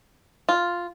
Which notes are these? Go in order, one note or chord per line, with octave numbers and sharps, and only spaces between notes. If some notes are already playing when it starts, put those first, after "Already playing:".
F4